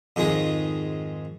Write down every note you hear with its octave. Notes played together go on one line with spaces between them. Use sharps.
F2 G#2 D#3 G#3 G#4